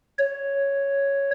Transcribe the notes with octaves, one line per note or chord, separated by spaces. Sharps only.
C#5